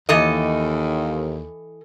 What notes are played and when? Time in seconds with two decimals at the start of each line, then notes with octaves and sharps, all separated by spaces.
0.09 D#2 E3 A4 D#5